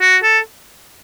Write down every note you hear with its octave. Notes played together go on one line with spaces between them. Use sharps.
F#4
A4